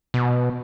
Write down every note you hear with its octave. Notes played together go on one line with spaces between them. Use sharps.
B2